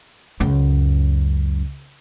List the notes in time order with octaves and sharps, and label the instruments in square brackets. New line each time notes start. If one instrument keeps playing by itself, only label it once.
[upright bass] C#2 F#2